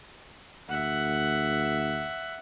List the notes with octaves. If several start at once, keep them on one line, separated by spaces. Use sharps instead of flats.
D2 E5 F#5